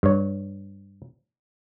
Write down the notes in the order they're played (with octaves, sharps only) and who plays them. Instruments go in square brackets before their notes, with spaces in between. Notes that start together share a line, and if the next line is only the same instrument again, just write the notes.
[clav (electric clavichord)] G2 C#5